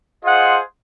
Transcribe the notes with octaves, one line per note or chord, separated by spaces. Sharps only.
F4 G#4 C5 D#5 F#5